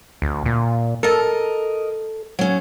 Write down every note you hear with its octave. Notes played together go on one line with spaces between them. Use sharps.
D2
A#2
A4 A#4 D#5
F#3 C#4